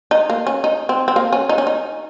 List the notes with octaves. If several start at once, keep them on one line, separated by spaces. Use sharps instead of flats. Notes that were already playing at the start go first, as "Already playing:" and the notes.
D#4
A#3
C#4
D#4
C4
C4
A#3
C#4
D#4
C#4
D#4